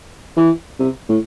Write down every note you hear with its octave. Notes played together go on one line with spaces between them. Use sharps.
E3
C3
A2